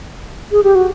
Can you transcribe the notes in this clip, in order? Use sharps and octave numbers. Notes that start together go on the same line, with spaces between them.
G#4
G4
F#4